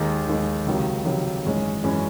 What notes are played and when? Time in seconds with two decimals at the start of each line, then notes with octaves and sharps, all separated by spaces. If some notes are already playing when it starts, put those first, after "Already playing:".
Already playing: D#2 D#3 G#3
0.28 D#2 D#3 G#3
0.66 C#2 C3 D#3 F#3
1.05 C#2 C3 D#3 F#3
1.45 G#1 F#2 E3 G#3 C#4
1.84 F#2 E3 G#3 C#4